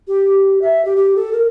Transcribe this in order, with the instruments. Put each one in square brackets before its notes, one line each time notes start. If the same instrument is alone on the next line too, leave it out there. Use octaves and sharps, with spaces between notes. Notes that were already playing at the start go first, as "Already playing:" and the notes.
[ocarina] G4
E5
G4
G4
A4
A#4